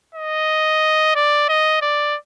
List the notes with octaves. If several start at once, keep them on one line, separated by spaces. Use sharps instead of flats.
D#5
D5
D#5
D5